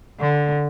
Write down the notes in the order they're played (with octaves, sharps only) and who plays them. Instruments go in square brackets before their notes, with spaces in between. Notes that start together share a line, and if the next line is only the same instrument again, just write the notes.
[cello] D3